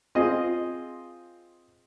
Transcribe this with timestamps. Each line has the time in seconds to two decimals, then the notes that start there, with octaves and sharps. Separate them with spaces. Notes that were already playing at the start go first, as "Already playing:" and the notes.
0.15 C4 F4 G#4 D#5